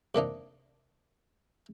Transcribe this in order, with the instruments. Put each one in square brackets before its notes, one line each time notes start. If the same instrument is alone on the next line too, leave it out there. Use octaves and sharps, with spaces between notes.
[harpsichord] C3 A#3 D4 D#4